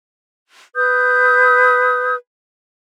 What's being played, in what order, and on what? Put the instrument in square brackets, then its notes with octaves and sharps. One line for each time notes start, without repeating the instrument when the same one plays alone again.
[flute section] B4 D#6 G6